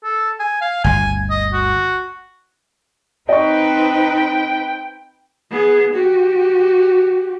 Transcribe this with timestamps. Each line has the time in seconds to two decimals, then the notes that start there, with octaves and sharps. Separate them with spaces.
0.04 A4
0.40 G#5
0.61 F5
0.84 G1 D2 G#5
1.30 D#5
1.53 F#4
3.29 C4 D#4 B4 D#5 G5 C#6
5.51 B3 G#4
5.94 F#4 G4